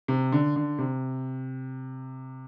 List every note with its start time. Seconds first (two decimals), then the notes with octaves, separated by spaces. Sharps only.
0.08 C3
0.32 D3
0.56 D3
0.79 C3